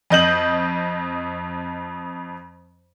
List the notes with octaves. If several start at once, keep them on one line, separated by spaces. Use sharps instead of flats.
F2 D#5 G6 F#7